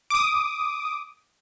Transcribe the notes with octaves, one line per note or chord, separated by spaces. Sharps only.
D6 D#6